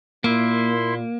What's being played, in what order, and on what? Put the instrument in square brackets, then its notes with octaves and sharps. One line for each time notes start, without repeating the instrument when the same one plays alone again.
[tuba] A#2 [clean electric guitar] A#3 [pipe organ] E4 E5 C6